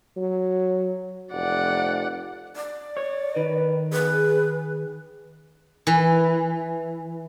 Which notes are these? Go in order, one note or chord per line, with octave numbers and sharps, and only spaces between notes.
F#3
F1 D5 F#5
D5
C#5
D#3 B4
G#4 B4
E3